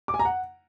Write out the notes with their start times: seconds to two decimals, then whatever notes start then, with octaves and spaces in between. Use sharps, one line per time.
0.08 D6
0.14 G#5
0.19 A#5
0.25 F#5